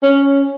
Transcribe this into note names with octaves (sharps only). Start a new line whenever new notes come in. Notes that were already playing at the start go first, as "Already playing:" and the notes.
C#4